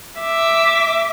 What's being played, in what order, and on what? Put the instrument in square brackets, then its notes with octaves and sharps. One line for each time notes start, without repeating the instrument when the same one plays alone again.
[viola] E5 D6